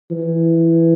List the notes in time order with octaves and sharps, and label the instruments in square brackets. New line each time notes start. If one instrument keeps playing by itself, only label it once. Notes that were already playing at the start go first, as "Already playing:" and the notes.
[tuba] E3